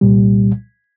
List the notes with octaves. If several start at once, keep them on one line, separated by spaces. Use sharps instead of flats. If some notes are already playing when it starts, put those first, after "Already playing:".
C2 A#2 G3